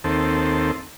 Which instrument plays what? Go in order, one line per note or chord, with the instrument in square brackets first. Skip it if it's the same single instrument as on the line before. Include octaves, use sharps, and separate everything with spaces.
[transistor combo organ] D#2 C4 A4